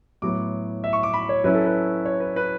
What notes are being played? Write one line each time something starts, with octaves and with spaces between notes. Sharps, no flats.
A2 F#3 B3 D6
E5
C#6
D6
B5
C#5
F#3 C#4 E4 B4
A4
B4
C#5
B4
B4